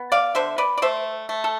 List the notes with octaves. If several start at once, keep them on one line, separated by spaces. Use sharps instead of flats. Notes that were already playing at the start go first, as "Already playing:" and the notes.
Already playing: B3
D5 F5
D3 C5 E5
B4 D5
D5
A3 C5 E5
A3
A4